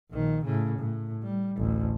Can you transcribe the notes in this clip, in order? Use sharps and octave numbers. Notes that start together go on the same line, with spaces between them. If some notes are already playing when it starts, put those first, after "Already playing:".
A#1 D#3
A2 C#3
A2
G3
A1 D2